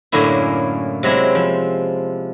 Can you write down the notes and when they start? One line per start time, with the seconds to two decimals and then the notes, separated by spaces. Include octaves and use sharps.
0.12 F#2 A2 D3 A#3 C#4 E4
1.03 C3 F#3 G#3 C4 E4
1.35 F3